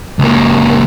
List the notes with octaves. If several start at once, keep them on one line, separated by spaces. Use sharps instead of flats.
C#2 A#3